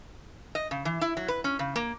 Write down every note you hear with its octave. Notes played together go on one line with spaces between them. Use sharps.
D#5
C#3
E3
E4
F#3
B4
C#4
C#3
A#3